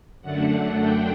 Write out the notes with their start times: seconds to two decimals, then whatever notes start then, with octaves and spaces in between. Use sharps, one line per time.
0.22 F#2 D3 A3 D4 F#5
0.78 G5